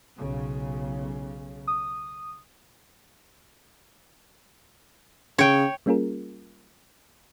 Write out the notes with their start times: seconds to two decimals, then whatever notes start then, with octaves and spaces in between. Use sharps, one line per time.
0.17 B1 C#3
1.67 D#6
5.38 C#3 C#5 G5
5.86 G3 A#3 C#4 F4 G#4 A#4